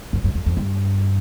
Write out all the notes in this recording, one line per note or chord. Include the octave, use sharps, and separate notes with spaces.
F#2
F#2
F2
F2
G2